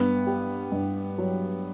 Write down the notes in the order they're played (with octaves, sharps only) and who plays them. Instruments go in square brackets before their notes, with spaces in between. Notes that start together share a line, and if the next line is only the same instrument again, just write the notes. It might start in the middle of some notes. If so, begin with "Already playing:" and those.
Already playing: [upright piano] G2 [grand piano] B3
[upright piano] G4
G2
F#3